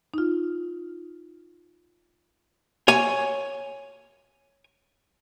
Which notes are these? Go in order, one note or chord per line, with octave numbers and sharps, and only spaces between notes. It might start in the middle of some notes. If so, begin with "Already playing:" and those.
D#4 F4
C#5 G#5